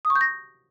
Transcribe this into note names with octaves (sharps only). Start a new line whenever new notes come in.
D#6
C#6
G6
A#6